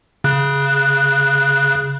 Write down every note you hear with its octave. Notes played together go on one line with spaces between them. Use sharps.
C#3 F#6